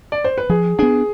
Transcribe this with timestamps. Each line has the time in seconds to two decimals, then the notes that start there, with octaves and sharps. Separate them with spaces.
0.12 D5
0.24 C5
0.38 B4
0.49 F3 G#4
0.79 B3 D4 G#4